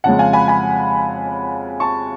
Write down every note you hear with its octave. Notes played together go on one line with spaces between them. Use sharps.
F2 C#3 G#3 F#5 A5
F5 G#5
G#5 B5
G#5 B5
A5 C#6